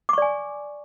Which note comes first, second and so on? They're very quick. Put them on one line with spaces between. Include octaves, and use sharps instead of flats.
D6 C#6 D5 G#5